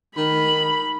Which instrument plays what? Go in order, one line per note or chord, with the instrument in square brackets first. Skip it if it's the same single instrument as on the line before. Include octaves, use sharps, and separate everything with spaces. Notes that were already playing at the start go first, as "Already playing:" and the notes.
[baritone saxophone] D#3 [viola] B5